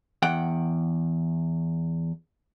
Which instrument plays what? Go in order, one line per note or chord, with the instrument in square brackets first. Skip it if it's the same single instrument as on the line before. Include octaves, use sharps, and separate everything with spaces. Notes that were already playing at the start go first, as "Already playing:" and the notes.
[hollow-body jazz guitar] E2 F#5 G5